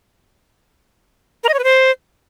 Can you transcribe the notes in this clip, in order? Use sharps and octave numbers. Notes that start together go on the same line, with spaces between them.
A#4
D#5
C#5
B4
C5